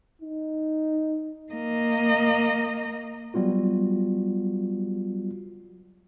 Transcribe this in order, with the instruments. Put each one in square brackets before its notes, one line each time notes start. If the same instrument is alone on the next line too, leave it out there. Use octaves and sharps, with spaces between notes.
[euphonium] D#4
[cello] A#3 D#5
[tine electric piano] F#3 G3 B3 F4 F#4